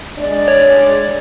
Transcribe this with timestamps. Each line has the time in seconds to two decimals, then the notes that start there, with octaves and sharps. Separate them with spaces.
0.19 G#3 D4 D5
0.48 C#5